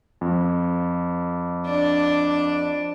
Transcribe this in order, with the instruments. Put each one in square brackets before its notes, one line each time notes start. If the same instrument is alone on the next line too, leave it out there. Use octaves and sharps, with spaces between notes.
[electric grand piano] F2
[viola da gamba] D4